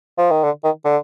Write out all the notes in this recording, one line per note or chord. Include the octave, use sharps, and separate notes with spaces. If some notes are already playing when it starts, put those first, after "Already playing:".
F3
D#3
D3
D#3
D3